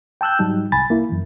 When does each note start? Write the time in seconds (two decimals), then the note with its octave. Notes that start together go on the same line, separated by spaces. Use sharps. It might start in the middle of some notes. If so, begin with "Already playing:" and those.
0.21 G5 A5 E6 F#6 G6
0.39 G#2 F#3 G3 D#4
0.72 C2 G#5 B5 A6
0.89 C2 A#3 E4
1.09 F#2 E3